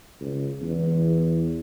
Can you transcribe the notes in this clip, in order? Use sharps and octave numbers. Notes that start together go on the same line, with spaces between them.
C#2
E2